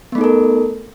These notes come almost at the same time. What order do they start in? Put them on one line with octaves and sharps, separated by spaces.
B3 A3 D#4 A4 A#4